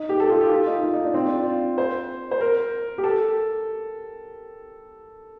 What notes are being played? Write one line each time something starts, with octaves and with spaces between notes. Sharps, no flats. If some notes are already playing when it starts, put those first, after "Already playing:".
Already playing: D#4
G4
A4
F4
G4
F4
D#4
F4
D#4
D4
C4
D4
F4
C5
C5
A#4
G4
A4